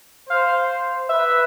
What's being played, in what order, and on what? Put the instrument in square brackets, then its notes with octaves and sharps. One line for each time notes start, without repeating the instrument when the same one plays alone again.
[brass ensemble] C5 [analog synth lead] F5
[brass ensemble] B4 [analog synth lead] E5